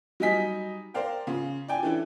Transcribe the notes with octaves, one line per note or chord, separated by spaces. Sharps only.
F#3 G3 D#4 D#5 G#5 B6
A#4 C5 D5 F5 G5
C#3 F4
D5 G5 G#5
E3 C#4 D4 E4 A4